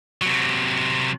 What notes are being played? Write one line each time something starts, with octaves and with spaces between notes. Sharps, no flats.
C3 F#3